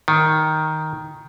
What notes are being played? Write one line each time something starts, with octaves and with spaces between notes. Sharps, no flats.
D#3